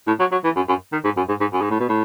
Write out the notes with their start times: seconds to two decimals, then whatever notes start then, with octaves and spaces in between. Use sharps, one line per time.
0.07 A2
0.20 F#3
0.32 F#3
0.44 E3
0.56 F#2
0.68 F#2
0.92 D#3
1.04 G#2
1.17 F#2
1.28 G#2
1.40 G#2
1.53 F#2
1.61 G#2
1.70 A2
1.80 B2
1.89 A2